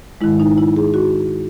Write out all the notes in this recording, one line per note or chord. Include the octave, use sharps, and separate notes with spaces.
G#2 D#3 G#3 E4
D#4
E4
G#4
F#4